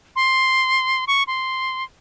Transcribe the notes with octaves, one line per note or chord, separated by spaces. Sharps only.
C6
C#6
C6